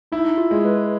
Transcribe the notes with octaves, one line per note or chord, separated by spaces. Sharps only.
D#4 E4
F4
G#3
B4